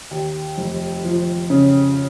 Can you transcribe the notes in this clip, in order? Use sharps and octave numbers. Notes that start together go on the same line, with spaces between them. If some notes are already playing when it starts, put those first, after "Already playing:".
D#2
F1
F3
C#3